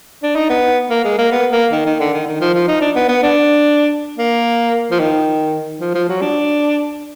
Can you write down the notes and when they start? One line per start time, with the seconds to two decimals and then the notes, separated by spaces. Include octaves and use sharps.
0.23 D4
0.36 D#4
0.49 B3
0.90 A#3
1.04 G#3
1.18 A#3
1.31 B3
1.52 A#3
1.72 D#3
1.86 D#3
2.00 D3
2.14 D#3
2.26 D#3
2.41 F3
2.54 F3
2.68 D#4
2.81 D4
2.95 B3
3.09 B3
3.23 D4
4.18 A#3
4.91 F3
5.00 D#3
5.81 F3
5.95 F3
6.09 F#3
6.22 D4